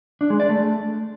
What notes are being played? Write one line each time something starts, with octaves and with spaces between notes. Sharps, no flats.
D4
G#3
D5
A3